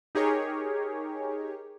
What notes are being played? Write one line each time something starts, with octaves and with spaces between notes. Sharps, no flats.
D#4 G4 G#4 A#4 C#5